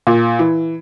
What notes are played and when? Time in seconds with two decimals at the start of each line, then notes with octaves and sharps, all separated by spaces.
0.07 A#2
0.39 E3